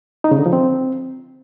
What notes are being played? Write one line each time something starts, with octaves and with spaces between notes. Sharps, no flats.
D#4
C#3
D3
F3
C4